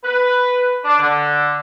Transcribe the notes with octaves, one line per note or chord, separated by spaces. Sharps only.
B4
D4
D3